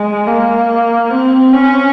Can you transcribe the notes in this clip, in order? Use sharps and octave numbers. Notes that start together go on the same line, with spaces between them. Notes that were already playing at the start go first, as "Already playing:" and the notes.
Already playing: G#3
A#3
C4
C#4